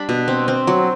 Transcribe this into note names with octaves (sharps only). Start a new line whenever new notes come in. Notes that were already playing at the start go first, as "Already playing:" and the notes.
Already playing: G3 D4 A5 B5
B2
C4
C4
F#3